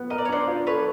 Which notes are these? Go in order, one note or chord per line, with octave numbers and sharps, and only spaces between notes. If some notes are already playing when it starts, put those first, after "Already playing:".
Already playing: B3
A#4 D#5
D5
C#5
D4 C5 D5
F4
A4 B4 C#5